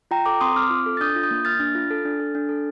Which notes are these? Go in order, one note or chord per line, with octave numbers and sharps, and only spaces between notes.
F4 G5 A#5
A4 A#5 D6
C4 C6 D#6
C4 D6 F6
F4
A4
A6
D4 D#6 G6
F4
D#6 G6
A#3
A#3 F6 A6
D4
F4
A4
D4
A4
D4
A4